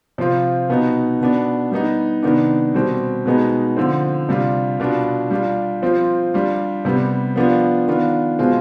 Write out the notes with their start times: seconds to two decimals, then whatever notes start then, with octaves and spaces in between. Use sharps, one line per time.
0.18 C3 F3 C4 F4
0.69 B2 B3 D#4
1.21 B2 B3 D4
1.72 G3 B3 D#4
2.23 C3 D#3 B3 D4
2.74 B2 G3 C4
3.26 B2 G#3 B3 D#4
3.77 D3 F3 C4
4.29 C3 G3 D4 F4
4.80 B2 B3 D4 F4
5.30 G3 D4 F4
5.82 F3 C4 F4
6.34 G3 D4 F4
6.85 C3 G3 B3
7.36 F3 B3 D4 F4
7.87 D#3 B3 D4 F4
8.39 B2 G#3 C4 F4